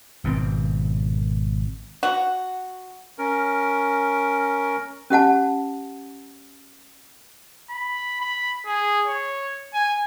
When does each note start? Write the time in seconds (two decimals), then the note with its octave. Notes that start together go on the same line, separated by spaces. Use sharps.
0.24 G#1 B2 D3 C4
2.03 F#4
3.18 C#4 A#4
5.10 C#4 G4 F#5 A5
7.70 B5
8.21 B5
8.66 G#4
9.07 C#5
9.74 G#5